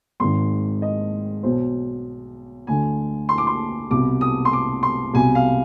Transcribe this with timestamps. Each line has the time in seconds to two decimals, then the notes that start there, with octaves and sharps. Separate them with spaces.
0.20 G#1 G#2 D#3 C6
0.82 D#5
1.43 B1 B2 C5
2.67 D2 D3 G#5
3.29 C6
3.38 D6
3.47 C6
3.91 C2 B2 D6
4.21 D#6
4.45 C6
4.53 D6
4.83 C6
5.14 C2 B2 G#5
5.35 F5